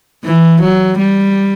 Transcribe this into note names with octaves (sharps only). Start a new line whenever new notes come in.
E3
F#3
G3